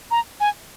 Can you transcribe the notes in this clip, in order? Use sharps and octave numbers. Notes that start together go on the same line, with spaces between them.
A#5
G#5